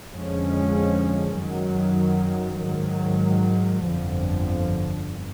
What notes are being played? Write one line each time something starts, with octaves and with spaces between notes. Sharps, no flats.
F2 D3 F3 G#3 C#4
F#2 D#3 F#3
G#2 D#3 F#3
G1 F2 D3 F3